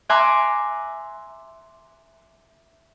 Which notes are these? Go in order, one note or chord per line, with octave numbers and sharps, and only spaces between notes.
E5 G#5 A#5 C6 D6 F#6